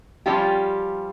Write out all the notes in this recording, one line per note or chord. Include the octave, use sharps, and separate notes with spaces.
F3 G3 C#4 F4 G4